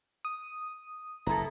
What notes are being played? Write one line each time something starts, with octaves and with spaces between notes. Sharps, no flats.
D#6
F#1 B3 E4 A4 A#5